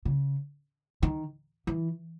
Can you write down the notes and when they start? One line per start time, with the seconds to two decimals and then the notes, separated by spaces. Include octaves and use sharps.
0.05 C#3
1.03 D#3
1.67 E3